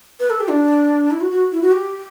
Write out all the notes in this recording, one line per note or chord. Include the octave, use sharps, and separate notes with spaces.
B4
A4
G4
D4
E4
F#4
F#4
E4
F#4
G4